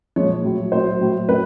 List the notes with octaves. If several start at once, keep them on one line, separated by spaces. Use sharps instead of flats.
A#2 F3 G#3 C#5
A2 F#3
A2 F#3 C5
A2 F#3
A2 F#3 B4